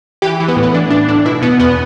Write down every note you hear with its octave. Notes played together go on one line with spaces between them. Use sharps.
E3 G4
E3
B3
A2
B3
E3 D4
E3 D4
A2 D4
B2 E4
B2 B3
E2 B3